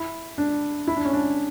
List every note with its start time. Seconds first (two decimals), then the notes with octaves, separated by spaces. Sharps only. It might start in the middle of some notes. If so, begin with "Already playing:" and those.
Already playing: E4
0.38 D4
0.87 E4
0.96 D4
1.05 C#4
1.13 D4